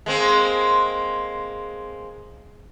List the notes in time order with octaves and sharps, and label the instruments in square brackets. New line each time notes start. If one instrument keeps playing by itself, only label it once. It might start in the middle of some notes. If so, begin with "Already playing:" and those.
[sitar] G#3 A#3 C4